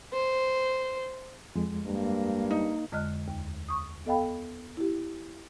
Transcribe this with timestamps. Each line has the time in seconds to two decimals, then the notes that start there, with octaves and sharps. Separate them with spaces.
0.13 C5
1.55 F2 G#3
1.86 G2 A#3
2.51 D#4
2.92 F2 D3 G#3 D#5 F6 F#6
3.28 D#2
3.69 C#6 D#6
4.06 B3 A4 D#5 F5 G5 B5
4.77 E4 G4